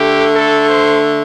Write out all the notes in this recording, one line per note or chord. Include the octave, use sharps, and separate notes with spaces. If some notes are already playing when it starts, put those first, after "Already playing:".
Already playing: D3 A3 G4
A4
C5